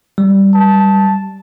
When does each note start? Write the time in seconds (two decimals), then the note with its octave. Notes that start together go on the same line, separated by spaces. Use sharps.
0.18 G3
0.54 A5